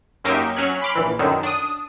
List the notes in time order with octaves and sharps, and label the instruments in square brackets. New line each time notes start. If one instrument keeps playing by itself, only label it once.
[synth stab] F#2 A#3 D#4 G4 E5 D7
F#3 C#4 F6 F#6 G#6
B5 C6 D6 F6
A#1 E3
F#2 D3 D#3
D4 D#6